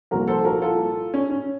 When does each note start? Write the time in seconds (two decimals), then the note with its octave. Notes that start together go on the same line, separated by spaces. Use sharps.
0.11 C2 A#2 F3 F#4 A#4
0.28 A4 C5
0.45 F#4 A#4
0.62 F4 A4
1.14 C#4
1.30 C#4